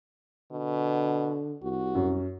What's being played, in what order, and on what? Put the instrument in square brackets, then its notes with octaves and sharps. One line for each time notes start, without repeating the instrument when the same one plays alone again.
[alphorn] B2 [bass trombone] D3
[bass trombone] C2 [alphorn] F#4
[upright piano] F#2